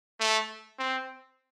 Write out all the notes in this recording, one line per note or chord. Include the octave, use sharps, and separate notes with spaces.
A3
C4